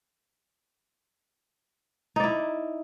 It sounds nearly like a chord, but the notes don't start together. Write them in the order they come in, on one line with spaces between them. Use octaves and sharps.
D#4 D5 E4